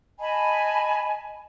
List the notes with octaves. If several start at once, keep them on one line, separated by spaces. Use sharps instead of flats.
D#5 G#5 A5 B5